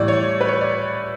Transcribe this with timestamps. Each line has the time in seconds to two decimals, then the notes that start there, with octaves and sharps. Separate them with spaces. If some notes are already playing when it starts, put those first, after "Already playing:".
Already playing: A2 E3 G3 D5
0.08 C#5
0.41 B4
0.48 C#5
0.61 D5